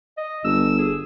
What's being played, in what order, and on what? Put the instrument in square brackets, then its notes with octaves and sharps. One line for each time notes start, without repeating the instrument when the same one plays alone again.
[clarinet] D#5
[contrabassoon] G1 [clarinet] E6
[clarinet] G#4